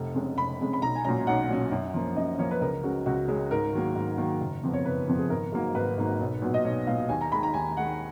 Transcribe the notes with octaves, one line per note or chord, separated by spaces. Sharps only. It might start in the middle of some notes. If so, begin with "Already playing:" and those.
Already playing: F1
F2 C#3 G#3 C#4
F1 B5
F2 C#3 G#3 C#4
B5
B1 A#5
G#5
A#2 F#3 C#4 A#5
B1 F#5
A#2 F#3 C#4
F#2
F3 A#3 C#4
F#2 D#5
F3 A#3 C#4 C#5
B4
C#2 A#4
C#3 G#3 C#4 F#4
C#2 F#4
C#3 G#3 C#4 G#4
G#2 A#4
D#3 F#3 A#3
G#2
D#3 F#3 A#3
F#1
F2 F3 B3
C#5
F#1 B4
F2 F3 B3
G#4
G#1 A#4
G#2 F#3 A#3
G#1 B4
G#2 F#3 A#3
B1
A#2 F#3 B3
D#5
B1 C#5
A#2 F#3 B3 F5
D#2 G#5
A#5
D#3 G#3 B5
A#5
D#2 G#5
D#3 G#3 F#5